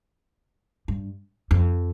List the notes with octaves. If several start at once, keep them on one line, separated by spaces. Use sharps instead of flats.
G2
F2